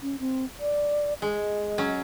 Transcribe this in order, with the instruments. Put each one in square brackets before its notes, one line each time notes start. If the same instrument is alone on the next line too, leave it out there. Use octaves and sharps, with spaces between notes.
[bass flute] C#4
C4
D5
[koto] G#3 [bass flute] D#5
[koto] F#3 C#4